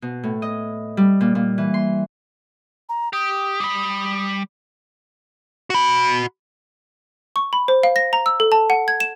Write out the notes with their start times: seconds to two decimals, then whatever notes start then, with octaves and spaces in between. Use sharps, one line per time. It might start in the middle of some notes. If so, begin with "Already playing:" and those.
0.02 B2
0.24 A2
0.42 D#5
0.97 G3
1.21 A#2
1.35 A#2
1.58 E3
1.74 C6
2.89 A#5
3.13 G4 D#6
3.60 G3 B5
5.70 F#4 B5
7.36 C#6
7.53 B5
7.68 C5
7.83 F5
7.96 A#6
8.13 A#5
8.26 E6
8.40 A4
8.52 A5
8.70 F#5
8.88 G#6
9.00 E7